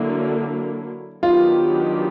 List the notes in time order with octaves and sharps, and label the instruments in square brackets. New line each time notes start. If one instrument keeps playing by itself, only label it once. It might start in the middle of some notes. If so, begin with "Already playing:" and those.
Already playing: [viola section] D3 F#3 A#3 [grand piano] E4
[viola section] D#3 F#3 B3 D4 G4 [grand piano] F4